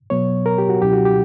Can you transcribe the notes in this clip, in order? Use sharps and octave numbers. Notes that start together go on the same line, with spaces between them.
B2 F#3 B3 C#5
A#4
G4
F#4
C#2 B2 F#3 C#4 E4 G4
F#4
G4